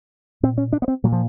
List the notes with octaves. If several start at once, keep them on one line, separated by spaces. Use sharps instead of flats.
A#2 C4
C#4
D4
B3
C4
A#2 F#3
F3